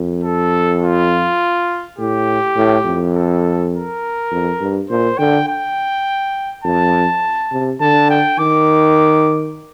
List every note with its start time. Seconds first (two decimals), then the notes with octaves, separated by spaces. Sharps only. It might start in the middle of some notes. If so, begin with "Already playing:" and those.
Already playing: F2
0.24 A4
0.82 F4
1.98 A2 G4
2.56 A2
2.86 F2
3.15 A4
3.73 A#4
4.31 F2
4.61 G2
4.90 A#2 C5
5.18 D3 G5
5.48 G5
6.64 F2 A5
7.52 C3
7.81 D3 A5
8.10 G5
8.39 D#3 D6